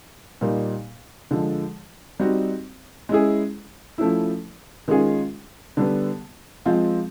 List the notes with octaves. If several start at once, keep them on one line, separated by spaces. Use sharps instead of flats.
A#2 G3 A#3 D#4
D3 F3 G#3
G3 C4 D#4 F#4
G#3 C#4 E4 G#4
F3 A3 C#4 E4
D#3 G#3 C#4 F4 G#4
D3 G3 B3
F3 G#3 C4 F4